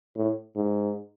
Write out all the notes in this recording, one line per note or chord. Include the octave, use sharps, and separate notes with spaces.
A2
G#2